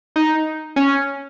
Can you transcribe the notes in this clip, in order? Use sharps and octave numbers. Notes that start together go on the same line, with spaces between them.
D#4
C#4